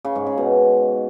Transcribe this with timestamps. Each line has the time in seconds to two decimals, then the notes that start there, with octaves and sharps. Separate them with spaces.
0.05 C#3
0.16 G#2
0.27 C#3
0.38 B2